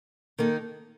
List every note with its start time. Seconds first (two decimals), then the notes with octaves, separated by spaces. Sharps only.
0.38 D#3 A#3 D#4 A4